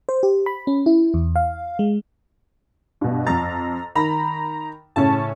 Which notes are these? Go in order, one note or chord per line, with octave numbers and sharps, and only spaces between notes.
C5
G4
B5
C#4
E4
E2
F5
G#3
G2 B2
F2 A#5 A6
D#3 A#5 B5
A2 C#3 C#4 A5